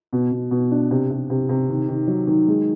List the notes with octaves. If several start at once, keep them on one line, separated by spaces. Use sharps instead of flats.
B2
B2
B2
D4
C3
C3
C3
C3
D#3
D#3
F#3
D#3
G#3